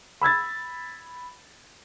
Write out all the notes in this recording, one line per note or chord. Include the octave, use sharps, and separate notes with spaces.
B5 E6 G#6 A6